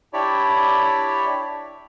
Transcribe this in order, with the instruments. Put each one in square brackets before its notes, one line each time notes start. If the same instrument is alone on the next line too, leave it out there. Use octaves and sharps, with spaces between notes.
[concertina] D4 E4 G4 C#5 D5 B5